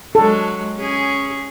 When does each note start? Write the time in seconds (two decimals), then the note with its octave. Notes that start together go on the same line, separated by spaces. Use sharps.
0.15 F#3 G#3 A4
0.77 C#4 G#4